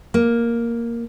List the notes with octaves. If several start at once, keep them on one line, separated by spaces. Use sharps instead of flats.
A#3